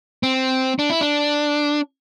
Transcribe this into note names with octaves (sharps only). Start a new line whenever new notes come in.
C4
D4
E4
D4